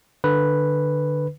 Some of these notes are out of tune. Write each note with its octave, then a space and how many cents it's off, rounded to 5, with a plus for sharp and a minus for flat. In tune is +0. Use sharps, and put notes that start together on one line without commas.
D3 +15 B4 +0